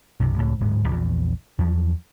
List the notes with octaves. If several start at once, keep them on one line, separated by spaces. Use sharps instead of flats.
B1 F#2 C3
C#2 A2
D1 G#2 G#3
A#1 E2
E2 F3 F#3